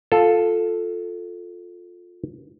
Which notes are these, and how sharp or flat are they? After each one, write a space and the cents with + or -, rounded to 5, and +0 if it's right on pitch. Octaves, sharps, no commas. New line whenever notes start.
F4 +15 A4 +0